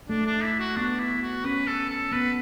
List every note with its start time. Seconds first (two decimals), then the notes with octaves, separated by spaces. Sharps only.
0.09 A3 D4
0.26 D4
0.43 E4
0.60 F#4
0.77 B3 D4
0.99 E4
1.22 F#4
1.44 C#4 B4
1.67 A4
1.90 A4
2.12 B3 B4